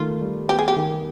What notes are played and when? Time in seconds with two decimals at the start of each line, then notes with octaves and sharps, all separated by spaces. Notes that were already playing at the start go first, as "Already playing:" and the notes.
Already playing: D#3 A3 F4
0.21 G3
0.48 B3 G4
0.59 G#4
0.68 G4
0.76 D#3